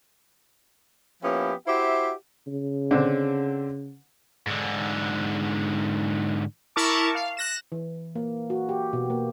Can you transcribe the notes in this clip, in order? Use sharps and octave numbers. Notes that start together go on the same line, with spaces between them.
F3 A#3 B3 C#4 E4 G4
E4 F#4 G4 C5 E5
C#3
D3 C4 D4
G#2 D3
E4 A#4 A5 C#6 D6
F5
F#6 A#6 E7
E3
A#3
F#4
G4
B2
A#3